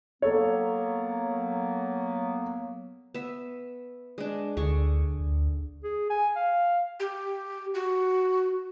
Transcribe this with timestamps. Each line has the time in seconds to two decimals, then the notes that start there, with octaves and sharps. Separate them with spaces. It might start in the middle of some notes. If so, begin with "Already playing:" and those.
0.22 F#3 A#3 B3 A4 C#5
3.14 B3 E5
4.18 G#3 D4
4.57 D2 D3 G#4 C#6
5.20 D2
5.84 G#4
6.10 G#5
6.36 F5
7.00 G4
7.74 F#4